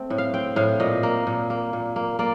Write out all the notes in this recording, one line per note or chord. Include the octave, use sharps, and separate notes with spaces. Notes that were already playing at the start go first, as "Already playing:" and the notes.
Already playing: A3 C4
A2
F5
C4 G5
A2 F5
A#2 D#5
A#3
A#2
A#3
A#2
A#3
A#3 D5